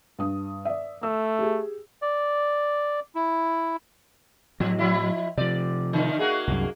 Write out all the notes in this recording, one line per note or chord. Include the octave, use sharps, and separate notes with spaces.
G2 D#6
D5 E5
A3 E6
G4 G#4
D5
E4
A2 F3 F#3
F3 E4
C3 F3 D5
D3 D#3
A#3 F#4 G#4
C2 F#2